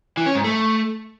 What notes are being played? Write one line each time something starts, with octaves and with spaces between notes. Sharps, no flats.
E3
C#4
G#2
A3